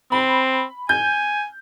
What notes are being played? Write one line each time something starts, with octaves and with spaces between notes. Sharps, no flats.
C4 B5
G#5 G6